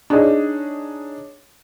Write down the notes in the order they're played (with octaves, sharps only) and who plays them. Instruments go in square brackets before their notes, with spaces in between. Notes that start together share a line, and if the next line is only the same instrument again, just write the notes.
[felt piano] D4 D#4 G#4 C#5 D#5